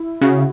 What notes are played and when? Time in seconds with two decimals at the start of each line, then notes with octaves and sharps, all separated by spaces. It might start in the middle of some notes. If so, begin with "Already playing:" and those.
Already playing: E4
0.21 C#3 F#4